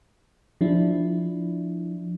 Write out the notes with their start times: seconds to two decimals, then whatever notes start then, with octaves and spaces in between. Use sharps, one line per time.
0.61 F3 D4 E4